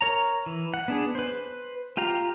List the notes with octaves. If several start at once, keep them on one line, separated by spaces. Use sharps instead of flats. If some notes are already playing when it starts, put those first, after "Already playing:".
A#4 C#5 A#5
E3
F#5
B3 D4 G#4
B4 C5
F4 G4 F5 A#5